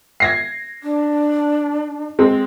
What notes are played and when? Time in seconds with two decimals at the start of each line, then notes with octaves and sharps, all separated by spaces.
0.20 G#6 A#6 C7
0.83 D4
2.19 G#3 C4